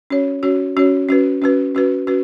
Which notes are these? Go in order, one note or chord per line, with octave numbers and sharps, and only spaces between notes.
C#4 F#4 C#5
C#4 F#4 C#5
C#4 F#4 C#5
C#4 F#4 B4
C#4 F#4 B4
C#4 F#4 B4
C#4 F#4 B4